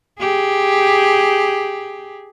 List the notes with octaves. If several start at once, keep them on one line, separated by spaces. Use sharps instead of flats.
G4 G#4